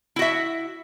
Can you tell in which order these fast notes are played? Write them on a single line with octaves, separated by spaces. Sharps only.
E4 F#4 E5